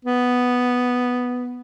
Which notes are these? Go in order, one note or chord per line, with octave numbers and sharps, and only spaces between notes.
B3